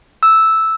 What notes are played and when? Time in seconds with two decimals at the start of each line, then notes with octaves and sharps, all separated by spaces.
0.23 E6